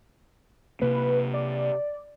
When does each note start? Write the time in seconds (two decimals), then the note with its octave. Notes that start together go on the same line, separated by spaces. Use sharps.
0.81 C3 A#3 B4
1.34 D5